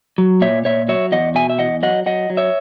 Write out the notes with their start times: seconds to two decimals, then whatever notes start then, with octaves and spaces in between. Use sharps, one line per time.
0.18 F#3
0.41 A#2 C#5 E5
0.65 A#2 C#5 E5
0.88 F#3 C#5 E5
1.12 E2 D#5 F#5
1.35 B2 E5 G#5
1.50 E5
1.59 E2 D#5 F#5
1.83 F#3 D#5 F#5
2.06 F#3 D#5 F#5
2.30 F#3
2.37 C#5 E5